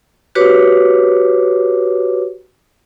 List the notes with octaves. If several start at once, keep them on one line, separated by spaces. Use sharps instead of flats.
F#4 G4 B4 C#5 D6